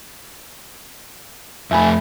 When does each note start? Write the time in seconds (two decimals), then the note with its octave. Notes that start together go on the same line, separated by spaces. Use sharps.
1.71 F2 A3 E5 G#5 B5